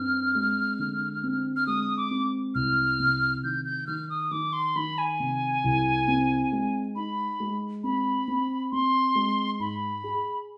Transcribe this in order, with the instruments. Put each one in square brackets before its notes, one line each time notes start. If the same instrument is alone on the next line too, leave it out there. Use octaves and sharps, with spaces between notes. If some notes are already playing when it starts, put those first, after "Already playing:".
Already playing: [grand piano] G2 C4 [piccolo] F6
[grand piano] G#3
D3
C4
[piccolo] F6
[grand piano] G#3 [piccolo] D#6
[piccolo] D6
[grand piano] C4
[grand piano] C2 [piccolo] F6
[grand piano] C3
[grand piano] D#3 [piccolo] G6
[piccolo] G6
[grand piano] D#3 [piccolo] F6
[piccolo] D#6
[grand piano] D#3 [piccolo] D6
[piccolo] C6
[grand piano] D#3 [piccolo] B5
[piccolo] G#5
[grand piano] C3
C2
C4
G#3
[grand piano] D#4 [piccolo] B5
[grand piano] G#3
[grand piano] C4 [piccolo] B5
[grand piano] C4
[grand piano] C4 [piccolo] C6
[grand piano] G#3
[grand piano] G#2 [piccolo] B5
[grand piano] G#4